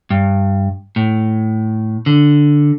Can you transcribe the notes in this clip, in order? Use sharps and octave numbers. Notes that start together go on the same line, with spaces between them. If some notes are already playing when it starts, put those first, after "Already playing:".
G2
A2
D3